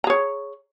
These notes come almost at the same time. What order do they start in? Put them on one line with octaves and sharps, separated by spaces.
A#5 G#4 C#5